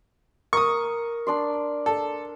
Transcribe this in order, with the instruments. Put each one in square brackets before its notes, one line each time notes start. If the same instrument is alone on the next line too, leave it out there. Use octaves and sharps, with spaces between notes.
[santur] A#4 [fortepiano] C#6 D#6
[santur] D4 D5 C6
[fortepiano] A4